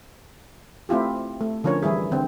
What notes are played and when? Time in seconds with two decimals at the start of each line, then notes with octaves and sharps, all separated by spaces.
0.89 A3 C4 E4 F4 G4
1.41 A3
1.64 D3 F3 C#4 A#4 C#5
1.83 E3 G3 E4 G#4
2.11 D3 C4